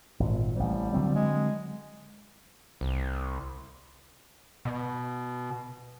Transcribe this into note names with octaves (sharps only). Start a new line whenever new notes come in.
G#1 A#2
A1 C3 G3
D3 F#3 C4
G#3
C2
B2